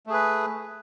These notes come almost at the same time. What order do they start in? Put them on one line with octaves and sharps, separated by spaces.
A3 G#4 B4